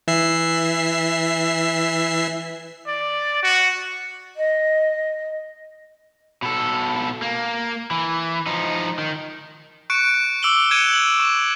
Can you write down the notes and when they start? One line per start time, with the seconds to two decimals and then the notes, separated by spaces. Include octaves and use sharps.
0.08 E3 E5 C7
2.87 D5
3.43 F#4
4.36 D#5
6.42 B2 A4
7.22 A#3
7.91 E3
8.47 F3 D#4
8.99 D#3
9.90 C#6 F#6 C#7 D7
10.43 D6 E6 D7 F#7 G7
10.71 F#6 G#6 C#7 D#7 E7
10.93 F#7
11.20 C#6